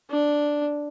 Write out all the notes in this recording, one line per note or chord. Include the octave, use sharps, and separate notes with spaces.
D4